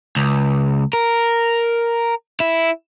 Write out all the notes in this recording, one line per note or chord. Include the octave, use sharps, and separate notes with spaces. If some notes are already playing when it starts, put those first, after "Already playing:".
C#2
A#4
E4